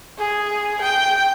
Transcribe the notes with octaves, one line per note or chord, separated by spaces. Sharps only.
G#4
G5